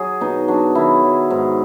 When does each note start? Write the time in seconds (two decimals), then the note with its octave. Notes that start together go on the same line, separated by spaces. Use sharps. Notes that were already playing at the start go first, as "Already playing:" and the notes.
Already playing: F#3 G#4
0.21 B2 D#4
0.48 F#3 D4
0.75 D#3 E4
1.03 F#3
1.30 G#2